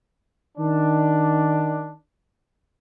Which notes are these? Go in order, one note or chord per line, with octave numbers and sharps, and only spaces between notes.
D#3 D4